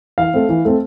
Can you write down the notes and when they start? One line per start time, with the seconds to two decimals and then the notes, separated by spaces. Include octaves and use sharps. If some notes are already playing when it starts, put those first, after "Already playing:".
0.18 E3 F5
0.34 A3 C4
0.49 E3
0.65 A3 C4